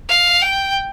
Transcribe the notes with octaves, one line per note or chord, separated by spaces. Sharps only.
F5
G5